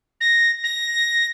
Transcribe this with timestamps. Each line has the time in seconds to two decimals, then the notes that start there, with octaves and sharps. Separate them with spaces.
0.20 A#6
0.63 A#6